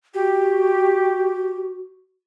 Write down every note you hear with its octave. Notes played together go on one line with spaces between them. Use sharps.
F#4 G4